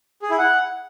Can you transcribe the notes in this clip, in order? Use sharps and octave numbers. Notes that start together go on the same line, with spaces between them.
G#4
E4
F#5